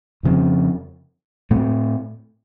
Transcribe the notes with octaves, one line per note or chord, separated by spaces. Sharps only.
F2 C#3 F3 C4
A2 A3 C4